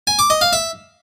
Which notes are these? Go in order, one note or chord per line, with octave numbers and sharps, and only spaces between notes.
G#5
D6
D#5
F5
E5